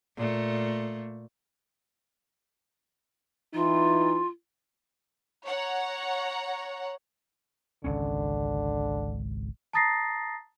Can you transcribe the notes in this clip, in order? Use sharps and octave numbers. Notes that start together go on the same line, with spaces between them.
A#2 A3 A#3
E3 D#4 F4
C#5 F#5 A#5
G#1 C#2 D3 C#4
A5 A#5 D#6 A6 A#6 C7